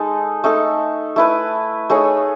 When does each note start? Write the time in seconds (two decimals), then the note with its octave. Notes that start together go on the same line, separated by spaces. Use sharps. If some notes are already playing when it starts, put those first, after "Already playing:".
Already playing: G#3 D#4 A4
0.44 A3 D#4 A4
1.16 A3 E4 B4
1.90 A3 D#4 G#4 C#5